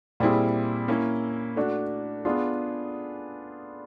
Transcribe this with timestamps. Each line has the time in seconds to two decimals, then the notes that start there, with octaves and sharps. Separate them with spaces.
0.20 A#2 G3 C4 E4 G#4
0.88 A#3 C#4 E4
1.56 A3 D4 F#4
2.25 B3 D4 F4 G#4